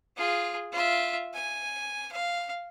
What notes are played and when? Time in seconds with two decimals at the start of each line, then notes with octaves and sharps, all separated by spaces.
0.17 F4 G#4
0.72 F4 E5
1.34 G#5
2.12 F5